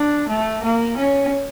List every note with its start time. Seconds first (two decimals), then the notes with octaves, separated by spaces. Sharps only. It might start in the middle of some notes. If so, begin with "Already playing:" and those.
Already playing: D4
0.28 A3
0.63 A#3
0.97 C#4